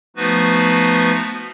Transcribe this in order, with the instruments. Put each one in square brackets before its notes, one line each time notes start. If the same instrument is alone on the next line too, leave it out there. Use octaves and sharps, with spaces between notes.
[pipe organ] F3 A3 B3 D#4 F#4 B4